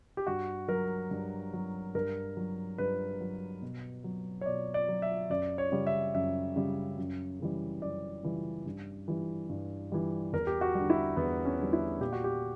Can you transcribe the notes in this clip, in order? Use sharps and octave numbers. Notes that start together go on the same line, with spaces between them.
G4
G2 F#4
F#3 A#4
G2
F#3
G2 A#4
F#3
G2 B4
F#3
B2
F#3
C#5
B2 D5
D5
F#3
E5
F#2 D5
C#5
C#3 G3
E5
F#2 E5
C#3 G3
F#2
C#3 E3 G3
F#2 D5
C#3 E3 G3
G2
E3 G3
G2
E3 G3
E2 A#4
G4
F#4
G3
D3
E4
E2 B3
C#4
D3 G3
E4
A#2 G4
F#4
G4